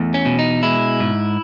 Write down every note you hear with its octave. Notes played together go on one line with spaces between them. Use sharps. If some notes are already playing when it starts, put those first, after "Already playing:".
Already playing: E2 A3
C#4
B2
D#4
G#3 E4
G#2